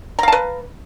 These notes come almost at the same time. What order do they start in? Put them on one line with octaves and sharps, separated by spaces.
A#5 F5 A5 B4